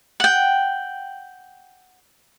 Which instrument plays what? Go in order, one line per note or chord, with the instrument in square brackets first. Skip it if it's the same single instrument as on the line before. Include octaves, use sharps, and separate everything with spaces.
[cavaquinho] F#5 G5